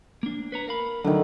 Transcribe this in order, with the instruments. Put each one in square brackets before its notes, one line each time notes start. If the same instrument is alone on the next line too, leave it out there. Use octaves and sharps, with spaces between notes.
[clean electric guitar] A#3 D4
B4 C#5 A#5
A#4 F5 B5
[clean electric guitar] D2 F#3 [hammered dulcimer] D3 D#3